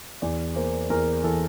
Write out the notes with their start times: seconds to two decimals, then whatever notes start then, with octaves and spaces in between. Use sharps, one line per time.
0.22 E2 D5
0.56 A#3 C5
0.90 E2 A#4
1.24 E3 A4